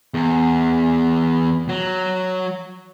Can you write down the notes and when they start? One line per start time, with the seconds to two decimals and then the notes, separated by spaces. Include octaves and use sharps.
0.14 E2
1.69 F#3